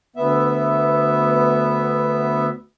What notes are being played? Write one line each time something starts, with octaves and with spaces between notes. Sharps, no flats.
D2 B3 E5